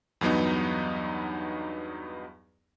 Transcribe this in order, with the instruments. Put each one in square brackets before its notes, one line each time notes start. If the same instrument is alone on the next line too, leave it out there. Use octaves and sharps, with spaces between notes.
[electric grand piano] E2 G2 F#3 B3 D#4